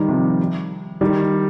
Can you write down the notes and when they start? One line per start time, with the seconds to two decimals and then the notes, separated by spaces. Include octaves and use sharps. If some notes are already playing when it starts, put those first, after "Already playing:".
Already playing: D#3 G3
0.08 C3 F3
1.01 D#3 G3